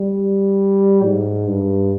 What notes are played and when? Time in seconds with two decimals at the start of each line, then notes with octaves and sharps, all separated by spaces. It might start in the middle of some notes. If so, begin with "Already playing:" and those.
Already playing: G3
1.05 G#2
1.47 G2